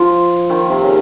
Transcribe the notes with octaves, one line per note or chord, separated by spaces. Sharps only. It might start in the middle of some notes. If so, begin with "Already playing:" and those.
Already playing: F3
D#3
C3
C#3